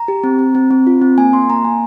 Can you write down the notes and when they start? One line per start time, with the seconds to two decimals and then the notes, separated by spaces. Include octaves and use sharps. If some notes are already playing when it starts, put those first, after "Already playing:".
Already playing: A#5
0.08 G4
0.24 C4
0.39 C4
0.55 C4
0.71 C4
0.87 F4
1.02 C4
1.18 A#3 G#5
1.33 A#3 C6
1.49 A#3 A#5
1.64 A#3 G#5